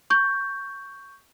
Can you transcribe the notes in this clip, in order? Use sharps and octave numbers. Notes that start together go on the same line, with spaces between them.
C#6 G6